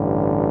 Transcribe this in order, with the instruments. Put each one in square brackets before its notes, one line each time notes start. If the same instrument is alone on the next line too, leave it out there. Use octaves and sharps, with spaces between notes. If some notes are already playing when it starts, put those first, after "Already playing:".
Already playing: [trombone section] A1 G2 D3